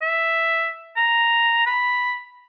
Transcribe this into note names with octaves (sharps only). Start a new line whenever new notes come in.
E5
A#5
B5